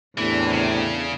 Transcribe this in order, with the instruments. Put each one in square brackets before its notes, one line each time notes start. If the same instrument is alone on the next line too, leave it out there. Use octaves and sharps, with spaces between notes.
[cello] E2 D4 [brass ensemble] A2 C3 [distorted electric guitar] E3
[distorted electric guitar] C#3